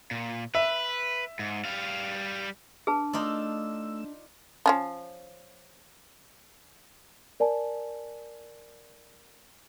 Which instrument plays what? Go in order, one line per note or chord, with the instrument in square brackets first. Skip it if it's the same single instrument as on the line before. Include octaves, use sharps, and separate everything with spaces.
[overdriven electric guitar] A#2
[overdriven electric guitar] B4 [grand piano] E5
[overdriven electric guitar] G#2
G3 F5
[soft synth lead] D4 [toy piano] G#4 B4 A5
[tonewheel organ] A3 E6 [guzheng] D#4 F4 D5
[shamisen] F3 C#4 D4
[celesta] A#4 D5 G#5 A5